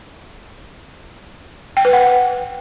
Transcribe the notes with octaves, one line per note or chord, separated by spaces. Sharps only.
G5
B4
F#5